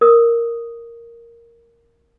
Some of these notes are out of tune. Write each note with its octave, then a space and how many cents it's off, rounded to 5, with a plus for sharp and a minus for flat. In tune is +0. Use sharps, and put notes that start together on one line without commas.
A#4 +0 D#6 +0